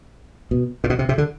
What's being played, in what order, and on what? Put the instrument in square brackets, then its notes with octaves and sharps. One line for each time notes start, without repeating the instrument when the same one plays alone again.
[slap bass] B2
A#2
B2
C3
C3
D3